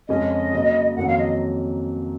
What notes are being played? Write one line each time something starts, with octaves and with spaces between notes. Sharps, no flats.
F2 C#3 G#3 C#4 G#4 D#5
C#3 F#3 A#3
F2 D#3 F#3 A#3 C#4 F#5
F5
D#5